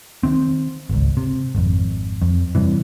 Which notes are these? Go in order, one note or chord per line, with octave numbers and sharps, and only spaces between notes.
D#3 C4
G#1 C#2
C3
G#1 F2
F2
G2 C3 E3